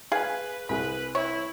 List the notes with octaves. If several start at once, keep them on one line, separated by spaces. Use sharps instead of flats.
G#4 B4 F5 G#5
C2 G#4 B4 B5
E4 C#5